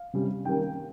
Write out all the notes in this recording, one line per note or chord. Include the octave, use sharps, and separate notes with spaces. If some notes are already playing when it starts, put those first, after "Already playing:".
Already playing: F5
C3 G3 C#4
D#3 G3 A#3 C#4 G5